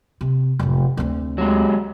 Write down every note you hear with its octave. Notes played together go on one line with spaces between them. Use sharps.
C3
F1 A2
D2 C4
F#3 G#3